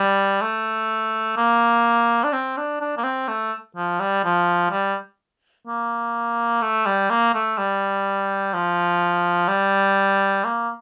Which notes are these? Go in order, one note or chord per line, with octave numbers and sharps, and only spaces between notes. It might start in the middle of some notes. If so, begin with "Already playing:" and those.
Already playing: G3
A3
A#3
D4
C4
D4
D4
A#3
C4
A3
F3
G3
F3
G3
A#3
A3
G3
A#3
A3
G3
F3
G3
A#3